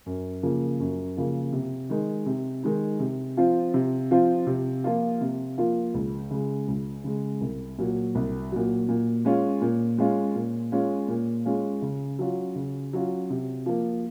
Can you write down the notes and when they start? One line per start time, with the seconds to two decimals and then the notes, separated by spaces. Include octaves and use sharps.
0.06 F#2
0.43 C#3 F3 A#3
0.80 F#2
1.17 C#3 F3 A#3
1.53 C3
1.90 D#3 G#3 D#4
2.26 C3
2.63 D#3 G#3 D#4
3.00 C3
3.37 F3 C4 F4
3.74 C3
4.11 F3 C4 F4
4.47 C3
4.84 F3 A#3 F4
5.21 C3
5.58 F3 A#3 F4
5.94 C#2
6.31 C#3 G#3
6.68 C#2
7.04 C#3 G#3
7.41 C2
7.78 A#2 F#3
8.15 C2
8.52 A#2 F#3
8.89 A#2
9.25 G#3 C#4 F4
9.62 A#2
9.98 G#3 C#4 F4
10.36 A#2
10.72 G#3 C#4 F4
11.08 A#2
11.45 G#3 C#4 F4
11.82 C#3
12.19 F#3 C#4 F4
12.55 C#3
12.93 F#3 C#4 F4
13.30 C3
13.66 F3 A#3